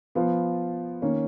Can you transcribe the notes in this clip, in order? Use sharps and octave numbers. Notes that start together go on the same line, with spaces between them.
F3 B3 F4
D#3 A#3 C#4